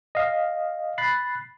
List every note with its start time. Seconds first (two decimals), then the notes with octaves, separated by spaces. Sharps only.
0.15 D#5 F5
0.98 B5 F#6 A6 C7